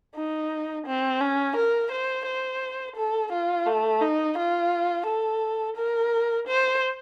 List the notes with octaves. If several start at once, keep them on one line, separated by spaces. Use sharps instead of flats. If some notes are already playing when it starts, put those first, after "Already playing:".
D#4
C4
C#4
A#4
C5
C5
A4
F4
A3
D#4
F4
A4
A#4
C5